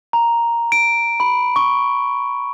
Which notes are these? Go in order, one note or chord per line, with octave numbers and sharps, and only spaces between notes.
A#5
D7
B5
C#6